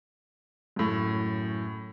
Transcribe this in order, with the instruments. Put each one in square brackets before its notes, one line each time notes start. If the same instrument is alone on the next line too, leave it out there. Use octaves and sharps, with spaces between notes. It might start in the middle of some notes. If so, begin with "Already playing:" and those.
[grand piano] F#2 A2